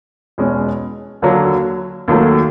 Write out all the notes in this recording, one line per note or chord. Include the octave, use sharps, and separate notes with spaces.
E2 B2 G#3 C#4
D#2 D3 F#3 A#3
D#2 D#3 F#3 A3